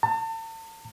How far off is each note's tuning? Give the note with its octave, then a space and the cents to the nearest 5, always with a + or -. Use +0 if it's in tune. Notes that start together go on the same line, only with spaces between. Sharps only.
A5 +40